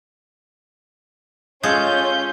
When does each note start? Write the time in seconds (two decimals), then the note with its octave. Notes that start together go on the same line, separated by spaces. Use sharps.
1.63 G#3 C#4 F4 A4 G6